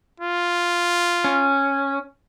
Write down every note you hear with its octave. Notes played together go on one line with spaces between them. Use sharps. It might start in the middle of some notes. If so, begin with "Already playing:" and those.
F4
C#4